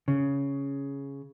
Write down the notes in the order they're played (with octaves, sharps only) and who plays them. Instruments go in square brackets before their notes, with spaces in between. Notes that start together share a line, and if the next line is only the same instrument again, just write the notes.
[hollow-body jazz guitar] C#3